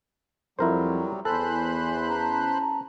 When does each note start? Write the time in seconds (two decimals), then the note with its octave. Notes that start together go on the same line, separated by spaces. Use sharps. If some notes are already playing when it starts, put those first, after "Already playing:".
0.59 F2 F#3 G3 E4 A#4 C5
1.25 E2 A4 C5 G#5 B5 F#6
2.08 C#4 A5 A#5